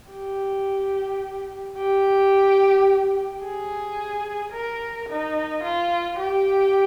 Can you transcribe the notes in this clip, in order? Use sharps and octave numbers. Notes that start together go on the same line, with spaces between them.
G4
G4
G#4
A#4
D#4
F4
G4